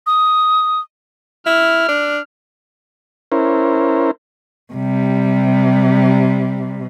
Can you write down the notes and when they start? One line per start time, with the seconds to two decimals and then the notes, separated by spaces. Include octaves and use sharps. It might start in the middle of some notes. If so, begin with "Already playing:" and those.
0.06 D#6
1.46 E4 F6
1.88 D4
3.32 C#4 E4 A#4 C5
4.74 C3 G3